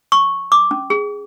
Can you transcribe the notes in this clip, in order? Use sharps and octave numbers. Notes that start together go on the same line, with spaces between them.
C#6
D6
C#4
G#4